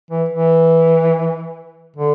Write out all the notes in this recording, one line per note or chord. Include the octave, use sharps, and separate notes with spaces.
E3
E3
D3